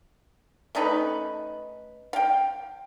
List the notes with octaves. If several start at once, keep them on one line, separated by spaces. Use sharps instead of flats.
A3 C#4 D#4 B4
F5 G5